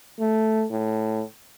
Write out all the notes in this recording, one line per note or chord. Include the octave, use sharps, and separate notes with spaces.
A3
A2